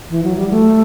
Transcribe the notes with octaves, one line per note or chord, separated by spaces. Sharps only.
E3
F#3
G3
A3